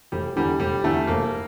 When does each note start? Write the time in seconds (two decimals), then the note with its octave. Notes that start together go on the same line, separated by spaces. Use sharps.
0.12 F1 G3
0.36 E2 D3 G3
0.60 F1 G3
0.83 E2 D3 A3
1.07 F1 A#3